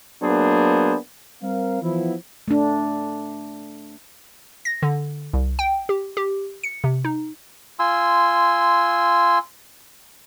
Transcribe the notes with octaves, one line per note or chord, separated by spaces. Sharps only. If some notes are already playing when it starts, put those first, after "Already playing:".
F#3 A#3 B3 D4 G#4 C5
G3 C4 A#4 F5
E3 F3 B3 E4
A3 D4
A#6
D3
C2
G5
G4
G4
C#7
C3
D#4
F4 G#5 C6 E6